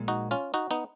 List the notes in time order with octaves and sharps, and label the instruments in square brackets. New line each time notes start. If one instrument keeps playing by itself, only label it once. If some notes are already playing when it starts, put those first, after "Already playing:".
Already playing: [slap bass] A#1 A#2 G#3
[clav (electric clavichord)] D#4 F#4
C#4 F4
D#4 F#4
B3 D#4